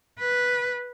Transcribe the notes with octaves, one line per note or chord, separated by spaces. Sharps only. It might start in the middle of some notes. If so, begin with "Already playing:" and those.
B4